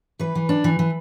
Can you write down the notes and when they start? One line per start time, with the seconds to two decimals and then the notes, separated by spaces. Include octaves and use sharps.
0.19 E3 B4
0.35 E3
0.49 D4
0.64 E3
0.79 E3